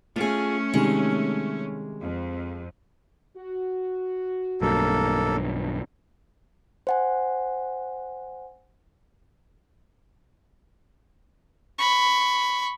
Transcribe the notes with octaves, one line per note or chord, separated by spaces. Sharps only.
A3 C#4 F4 G#4
C3 D#3 G3 G#3
F2
F#4
B1 G2 A#3 A4
C5 F#5 G#5
B5 C#6